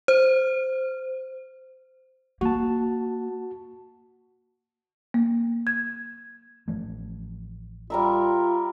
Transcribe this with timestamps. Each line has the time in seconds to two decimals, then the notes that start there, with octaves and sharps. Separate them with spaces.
0.08 C5
2.41 A#3 F#4 A5
5.14 A#3
5.67 G#6
6.68 A1 F3 A3
7.90 G3 F4 A#4 E5